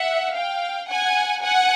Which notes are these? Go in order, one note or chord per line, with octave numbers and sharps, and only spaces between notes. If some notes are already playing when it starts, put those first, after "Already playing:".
Already playing: E5 F#5
F5 G5
F#5 G#5
F#5 G#5